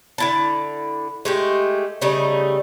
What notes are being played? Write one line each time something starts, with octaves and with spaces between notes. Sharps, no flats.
D3 E4 A5
G#3 A3 G4
C#3 G3 A3 D#4